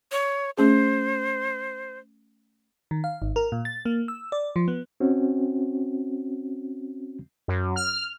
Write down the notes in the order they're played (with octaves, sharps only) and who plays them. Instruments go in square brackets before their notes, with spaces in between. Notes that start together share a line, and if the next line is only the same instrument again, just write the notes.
[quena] C#5
[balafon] A3 C#4 G#4 [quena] C5
[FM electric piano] D#3
F5
G#1
A#4
A#2
A6
A#3
E6
D5
F3
B3
[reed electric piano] C4 C#4 F#4
[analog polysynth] F#2
F6